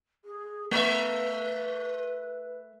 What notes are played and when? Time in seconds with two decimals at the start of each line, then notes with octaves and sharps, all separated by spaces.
0.25 G#4
0.71 A3 B4 E5